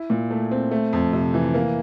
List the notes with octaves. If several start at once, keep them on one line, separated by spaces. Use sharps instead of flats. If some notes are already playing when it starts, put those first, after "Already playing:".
Already playing: E4
A#2
A3
C4
A3
F2
C3
E3
A#3